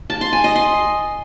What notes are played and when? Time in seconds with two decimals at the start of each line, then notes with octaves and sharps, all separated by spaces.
0.10 A5
0.21 C6
0.33 G#5
0.44 D#5
0.55 C6